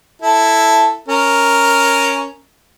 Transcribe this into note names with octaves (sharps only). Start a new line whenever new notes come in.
E4 A4
C#4 A#4